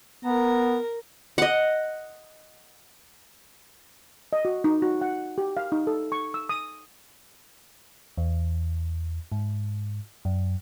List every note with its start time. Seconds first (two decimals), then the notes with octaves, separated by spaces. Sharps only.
0.25 B3 A#4 A#5
1.38 D#5 F#5
4.33 D#5
4.45 F#4
4.64 D#4
4.82 F#4
5.01 F#5
5.38 G4
5.57 F5
5.72 D#4
5.87 A4
6.12 C#6
6.34 E6
6.49 D#6
8.18 E2
9.32 G#2
10.25 F#2